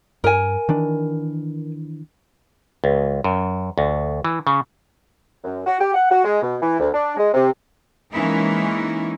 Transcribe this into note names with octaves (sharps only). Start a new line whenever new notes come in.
G2 A#4 G#5
D#3 E3 D4
C#2
F#2
D2
E3
C#3
F#2
F#4
G4
F#5
F#4
G#3
B2
E3
D2
D4
G#3
C3
E3 G#3 A#3 C#4 D#4 E4